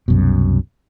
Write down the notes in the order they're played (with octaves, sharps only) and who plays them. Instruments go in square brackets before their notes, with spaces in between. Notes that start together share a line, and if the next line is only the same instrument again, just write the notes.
[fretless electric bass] C2 F#2 B2